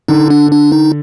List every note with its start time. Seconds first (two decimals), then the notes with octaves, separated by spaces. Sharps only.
0.08 D3 D#4
0.30 D4
0.51 D4
0.72 D#4